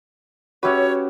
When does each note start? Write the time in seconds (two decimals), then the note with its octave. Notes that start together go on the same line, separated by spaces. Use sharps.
0.63 C#4 F#4 G4 B4 C#5 E5